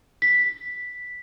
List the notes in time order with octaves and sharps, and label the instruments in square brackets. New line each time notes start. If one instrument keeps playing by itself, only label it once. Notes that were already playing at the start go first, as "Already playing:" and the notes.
[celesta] B6